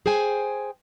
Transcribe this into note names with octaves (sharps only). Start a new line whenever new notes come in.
G#4 C5 G5 G#5